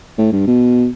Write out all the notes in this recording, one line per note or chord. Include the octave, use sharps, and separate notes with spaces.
A2
G2
B2